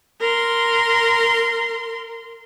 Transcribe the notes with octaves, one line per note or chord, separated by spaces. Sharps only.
A#4 C6